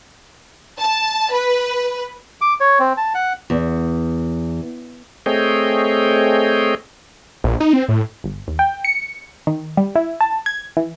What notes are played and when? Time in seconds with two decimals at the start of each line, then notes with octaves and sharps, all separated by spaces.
0.80 A5
1.32 B4
2.41 D6
2.60 C#5
2.79 C4
2.97 A5
3.15 F#5
3.50 E2
5.26 A3 C4 G#4 C#5 D#5 G5
7.44 A#1
7.60 D#4
7.73 C4
7.89 A2
8.24 G1
8.47 D#2
8.59 G5
8.85 C#7
9.47 D#3
9.77 G3
9.95 E4
10.21 A5
10.46 G#6
10.77 E3